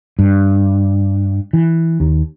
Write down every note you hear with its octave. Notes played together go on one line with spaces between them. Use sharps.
G2
E3
D#2